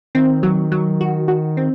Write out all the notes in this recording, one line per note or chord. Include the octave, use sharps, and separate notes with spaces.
D#3 C4
F#3
F#3
F#4
F#4
C4